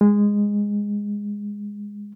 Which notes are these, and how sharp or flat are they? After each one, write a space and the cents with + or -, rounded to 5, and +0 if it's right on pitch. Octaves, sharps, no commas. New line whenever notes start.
G#3 -15